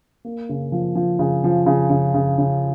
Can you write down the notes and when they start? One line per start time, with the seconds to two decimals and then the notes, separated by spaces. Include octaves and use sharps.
0.25 A#3
0.49 C#3
0.72 F3
0.96 F3
1.19 C#3
1.44 F3
1.66 C#3
1.90 C#3
2.14 C#3
2.39 C#3